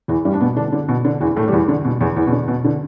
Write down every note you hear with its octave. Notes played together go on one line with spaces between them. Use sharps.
E2 E3
G2 G3
D4
B2 B3
D3 D4
D3
B2
D3
E2 E3
A2 A3
G3
E2 E3
D3
B2
E2 E3
E2 E3
B2
D3
B2
D3